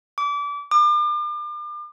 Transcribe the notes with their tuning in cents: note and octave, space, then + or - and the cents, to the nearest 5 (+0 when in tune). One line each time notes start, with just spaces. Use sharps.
D6 -30
D6 +40